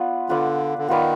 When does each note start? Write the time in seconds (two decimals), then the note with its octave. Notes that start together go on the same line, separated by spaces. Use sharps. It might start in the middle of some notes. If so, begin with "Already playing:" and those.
Already playing: B3 F4 B4 D5
0.29 D3 B3 F4 B4 D5
0.78 D3
0.88 D#3 B3 F4 B4 D5